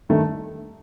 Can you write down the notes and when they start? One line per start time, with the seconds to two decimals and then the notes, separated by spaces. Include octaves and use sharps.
0.09 G2 D#3 A3